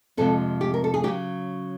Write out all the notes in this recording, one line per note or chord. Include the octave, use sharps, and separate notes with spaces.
F2 C3 F3 G#3 A4
G4
A#4
A4
G#4
C#3 F#3 G4